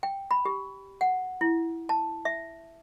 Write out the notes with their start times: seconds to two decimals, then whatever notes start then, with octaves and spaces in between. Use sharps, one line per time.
0.03 G5
0.31 B5
0.45 G4
1.01 F#5
1.41 E4
1.89 A5
2.25 E5